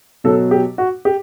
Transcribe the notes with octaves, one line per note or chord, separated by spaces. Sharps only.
B2 F#3 A4
G4
F#4
G4